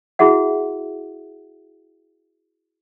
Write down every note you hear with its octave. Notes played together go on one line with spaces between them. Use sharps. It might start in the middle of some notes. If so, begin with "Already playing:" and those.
E4 F#4 G#4 E5 F#5